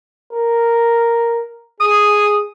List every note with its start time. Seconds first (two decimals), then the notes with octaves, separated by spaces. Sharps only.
0.33 A#4
1.80 G#4 D#6